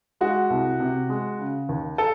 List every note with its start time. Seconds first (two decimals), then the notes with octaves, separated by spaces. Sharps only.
0.21 G#3 F#4
0.50 C2
0.80 C3
1.09 G#3
1.39 C#3
1.69 D#2
1.98 A4